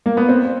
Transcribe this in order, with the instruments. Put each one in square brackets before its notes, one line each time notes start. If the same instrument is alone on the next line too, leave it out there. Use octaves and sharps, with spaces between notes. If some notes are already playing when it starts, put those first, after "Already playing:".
[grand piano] A#3
B3
C4